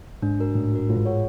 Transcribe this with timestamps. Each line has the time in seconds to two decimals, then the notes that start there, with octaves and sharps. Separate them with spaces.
0.22 G#2 D4
0.39 F#4 A#4
0.55 A2 D4
0.72 F#4 A#4
0.89 A2 F4
0.97 G#2
1.05 G#4 C#5 F#5